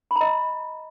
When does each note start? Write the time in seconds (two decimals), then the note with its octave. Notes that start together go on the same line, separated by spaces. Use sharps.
0.11 B5
0.16 A#5
0.21 D#5